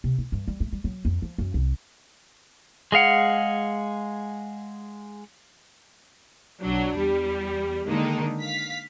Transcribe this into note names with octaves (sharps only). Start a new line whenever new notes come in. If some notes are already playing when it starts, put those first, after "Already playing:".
C3
E4
G2
G3
A3
G3
F#3
F2
F3
F#2
C2
G#3 G#4 F5 F#5
B1 F#3 D4
E2 G3
D3 D#3 G#3 A#3 D4 D#4
F5 B6